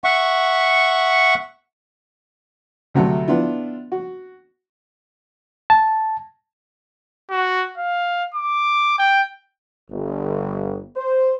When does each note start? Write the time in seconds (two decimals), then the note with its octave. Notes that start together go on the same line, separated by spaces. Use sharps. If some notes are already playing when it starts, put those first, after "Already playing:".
0.04 E5 F#5 C#6
2.94 D2 C3 F#3 A3
3.28 B3 D4 E4 F4
3.92 F#4
5.70 A5
7.31 F#4
7.78 F5
8.35 D6
8.99 G5
9.91 G1
10.96 C5